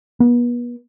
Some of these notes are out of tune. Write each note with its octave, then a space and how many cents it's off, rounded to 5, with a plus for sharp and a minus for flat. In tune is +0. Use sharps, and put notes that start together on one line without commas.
B3 -35